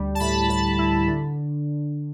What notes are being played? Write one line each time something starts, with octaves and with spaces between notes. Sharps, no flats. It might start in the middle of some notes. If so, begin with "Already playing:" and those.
Already playing: D2 G3
A5
A2 B5
A2 A5
E4
D3